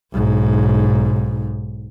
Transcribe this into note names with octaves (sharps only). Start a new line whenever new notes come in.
B1 G#2